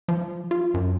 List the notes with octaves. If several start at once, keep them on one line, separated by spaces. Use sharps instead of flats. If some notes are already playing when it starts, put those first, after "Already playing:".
F3
F4
F#2